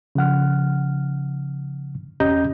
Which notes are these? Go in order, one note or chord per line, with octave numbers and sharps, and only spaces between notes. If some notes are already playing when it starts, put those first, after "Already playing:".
C#3 F3 F#5 F6
E2 C#4 G4 D#5 A#5 G6